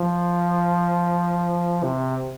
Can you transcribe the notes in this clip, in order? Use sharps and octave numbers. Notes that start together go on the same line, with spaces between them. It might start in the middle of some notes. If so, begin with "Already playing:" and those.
Already playing: F3
C3